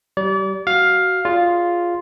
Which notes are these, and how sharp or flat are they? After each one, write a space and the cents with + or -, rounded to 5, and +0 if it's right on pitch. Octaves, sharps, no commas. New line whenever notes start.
G3 -30 D5 -35
F#4 +15 F5 +10
F4 +0 G#4 +0 D5 -25